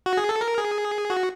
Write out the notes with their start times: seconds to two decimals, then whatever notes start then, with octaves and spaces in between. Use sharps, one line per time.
0.06 F#4
0.17 G#4
0.29 A4
0.41 A#4
0.58 G#4
1.10 F#4